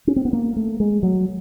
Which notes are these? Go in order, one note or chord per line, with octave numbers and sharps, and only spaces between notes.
C#4
C4
B3
A#3
A3
G#3
F#3